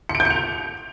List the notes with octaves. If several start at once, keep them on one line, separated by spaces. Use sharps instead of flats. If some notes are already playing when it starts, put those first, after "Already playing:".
C#7
D7
G6
C#7
F7